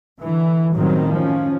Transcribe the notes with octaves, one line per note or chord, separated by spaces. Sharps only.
D3 E3
F#2 A2 D#3 F#3 G3 C4
F3 C#4